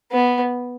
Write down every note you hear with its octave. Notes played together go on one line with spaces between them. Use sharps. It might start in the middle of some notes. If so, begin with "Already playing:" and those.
B3